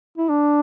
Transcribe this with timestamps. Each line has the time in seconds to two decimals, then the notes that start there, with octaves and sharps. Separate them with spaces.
0.18 E4
0.29 D4